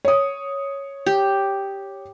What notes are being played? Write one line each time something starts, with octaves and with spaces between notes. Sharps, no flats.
C#5 D#6
G4